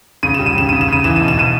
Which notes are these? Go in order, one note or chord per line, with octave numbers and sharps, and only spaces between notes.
C#3 D#7
G3 E7
D#7
C#3 E7
C#3 D#7
E7
C#3 D#7
E3 E7
D#7
B2
E7
B2 D#7